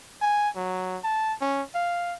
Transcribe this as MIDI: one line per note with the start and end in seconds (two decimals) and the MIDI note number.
0.22 0.49 80
0.56 0.98 54
1.03 1.33 81
1.41 1.62 61
1.75 2.16 77